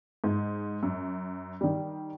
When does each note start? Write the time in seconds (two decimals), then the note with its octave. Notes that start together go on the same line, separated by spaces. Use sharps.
0.24 G#2
0.83 F#2
1.61 D#3 G3